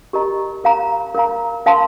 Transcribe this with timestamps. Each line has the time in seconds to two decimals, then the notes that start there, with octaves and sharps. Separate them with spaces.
0.13 G4 A#4 D#5 A#5
0.64 A#4 F5 A#5
1.15 A#4 F5 A#5
1.66 A#4 F5 A5 C6